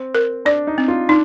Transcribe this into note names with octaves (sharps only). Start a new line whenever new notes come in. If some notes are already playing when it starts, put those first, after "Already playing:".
Already playing: C4
A#4
D4 D5
D#4
C4
F4
D4 D#4